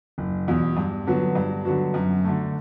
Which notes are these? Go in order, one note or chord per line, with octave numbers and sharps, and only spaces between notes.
F#1
E2 B2
G2
D3 F#3 B3 F#4
G2
D3 F#3 B3 F#4
F#2
D3 A3